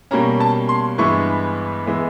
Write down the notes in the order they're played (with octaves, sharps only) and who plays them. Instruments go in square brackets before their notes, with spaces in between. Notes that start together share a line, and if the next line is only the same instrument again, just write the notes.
[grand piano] B2 G3 A#3 C#4 A#5
A5
C6
G2 E3 G#3 B3 E4 C#6
E3 G#3 B3 E4